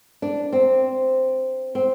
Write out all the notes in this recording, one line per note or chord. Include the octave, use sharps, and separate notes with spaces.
D4
C4
C4